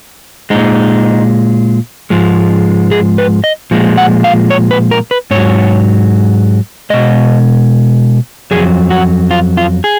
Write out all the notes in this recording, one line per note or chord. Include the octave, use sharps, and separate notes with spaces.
A#2 G#3 D#4
G#2 F3 G#3
G#4
B4
D#5
A#2 F3 G#3
F#5
F5
C#5
B4
A#4
B4
G#2 F#3 C#5
B2 G#3 D#5
F2 C#3 F#3 G#4
F#4
F4
F4
G#4